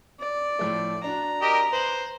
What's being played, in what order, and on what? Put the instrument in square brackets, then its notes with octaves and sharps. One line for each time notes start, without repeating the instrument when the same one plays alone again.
[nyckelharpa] D5
[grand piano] A2 F3 A3
[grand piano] D4 F#4 [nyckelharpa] A#5
[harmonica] G4 A#4 D#5
[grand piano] B4 F#7 [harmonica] C5